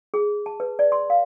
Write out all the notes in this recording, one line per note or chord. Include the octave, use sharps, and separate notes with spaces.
G#4
A5
B4
D5
C6
F5